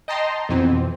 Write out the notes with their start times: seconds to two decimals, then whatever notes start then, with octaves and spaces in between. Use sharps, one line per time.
0.08 D#5 G5 A5 A#5 C6
0.49 F2 B2 E3 C4